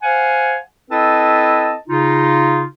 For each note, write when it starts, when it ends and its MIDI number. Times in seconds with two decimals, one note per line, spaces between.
0.03 0.56 72
0.03 0.56 77
0.03 0.56 78
0.03 0.56 80
0.91 1.73 60
0.91 1.73 64
0.91 1.73 69
0.91 1.73 71
0.91 1.73 75
0.91 1.73 81
1.88 2.63 49
1.88 2.63 63
1.88 2.63 65